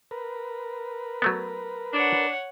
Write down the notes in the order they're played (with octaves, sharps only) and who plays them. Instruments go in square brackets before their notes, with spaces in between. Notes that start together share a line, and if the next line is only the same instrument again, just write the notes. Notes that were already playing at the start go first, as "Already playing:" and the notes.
[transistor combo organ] A#4 B4
[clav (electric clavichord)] F#3 A3 B3
[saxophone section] D4 [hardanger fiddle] C#5 F#5